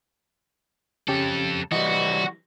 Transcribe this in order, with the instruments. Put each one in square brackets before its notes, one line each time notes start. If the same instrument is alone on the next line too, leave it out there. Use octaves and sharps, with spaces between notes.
[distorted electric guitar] F2 A4 [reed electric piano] C#3 C#4 G4
[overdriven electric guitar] E3 G3 [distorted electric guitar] F#4 [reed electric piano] D#5